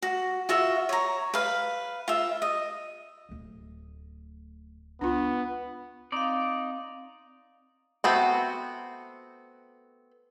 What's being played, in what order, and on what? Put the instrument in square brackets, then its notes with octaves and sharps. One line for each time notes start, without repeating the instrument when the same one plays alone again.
[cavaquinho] F#4
F4 F#4 E5
C#5 A#5
B4 F5
F4 E5
D#5
[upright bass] D1 D2
[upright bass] C#2 [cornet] B3 [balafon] D4 F4
[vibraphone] C4 F5 [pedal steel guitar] D#4 D5
[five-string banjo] A3 B3 C4 F#4